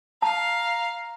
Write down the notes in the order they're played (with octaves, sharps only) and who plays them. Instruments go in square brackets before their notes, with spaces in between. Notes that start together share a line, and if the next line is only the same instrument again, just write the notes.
[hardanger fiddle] F5 [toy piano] A5 [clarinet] A#5